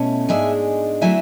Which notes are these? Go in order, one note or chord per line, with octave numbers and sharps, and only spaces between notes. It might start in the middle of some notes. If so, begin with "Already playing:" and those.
Already playing: B2 A3 C#4 E4
G#2 G#3 D4 E5 G#5
D3 F#3 A3 E4 E5 G#5